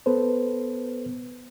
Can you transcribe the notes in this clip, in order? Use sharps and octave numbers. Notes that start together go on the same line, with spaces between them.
B3 A4 B4 C5